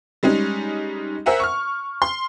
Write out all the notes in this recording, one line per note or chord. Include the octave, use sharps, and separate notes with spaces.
G3 G#3 C#4 D#4
A#4 C5 E5 F#5 G#5 A#5
C#6 F6
C6